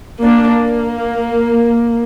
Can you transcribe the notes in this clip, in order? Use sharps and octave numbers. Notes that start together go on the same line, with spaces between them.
A#3 D4
A#3